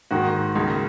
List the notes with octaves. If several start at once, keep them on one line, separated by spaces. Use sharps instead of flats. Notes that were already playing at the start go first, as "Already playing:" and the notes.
G#2 D#3 A#3 F#4
C#2 C#3 A#3